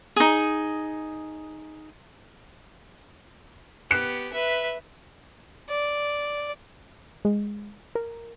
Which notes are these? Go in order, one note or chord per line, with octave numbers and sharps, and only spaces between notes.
D#4 G#4
B3 G4 F#6 C#7
B4 E5
D5
G#3
A#4